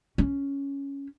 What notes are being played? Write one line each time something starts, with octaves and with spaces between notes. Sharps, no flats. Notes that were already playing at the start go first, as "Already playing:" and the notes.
C#4